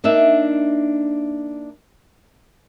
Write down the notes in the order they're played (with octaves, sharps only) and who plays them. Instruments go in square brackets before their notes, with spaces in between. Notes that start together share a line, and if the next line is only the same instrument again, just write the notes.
[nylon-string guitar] A#3 D4 D#4 E5